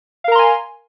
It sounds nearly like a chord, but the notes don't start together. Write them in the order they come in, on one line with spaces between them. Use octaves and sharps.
F5 A#4 A#5 C6 G#5